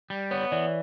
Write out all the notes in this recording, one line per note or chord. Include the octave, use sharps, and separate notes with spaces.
G3
B3 C#5
C#5
E3 D5